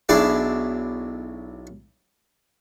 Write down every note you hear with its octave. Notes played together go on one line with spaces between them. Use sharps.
B1 D4 E4 G#4 D5